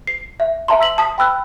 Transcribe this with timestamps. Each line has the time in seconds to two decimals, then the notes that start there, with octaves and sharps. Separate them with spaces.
0.07 C7
0.40 E5
0.68 E5 A5 A#5 C6
0.80 E6 B6 F#7
0.98 A5 D#6 B6
1.18 G5 B5 E6 F#6